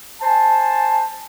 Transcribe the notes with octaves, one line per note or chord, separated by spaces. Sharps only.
C5 G#5 A5